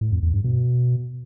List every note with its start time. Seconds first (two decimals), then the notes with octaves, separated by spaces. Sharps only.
0.01 A2
0.12 F2
0.23 E2
0.33 G2
0.44 B2